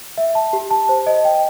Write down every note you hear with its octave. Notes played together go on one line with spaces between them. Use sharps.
E5
A5
G4
A5
C5
D#5
G5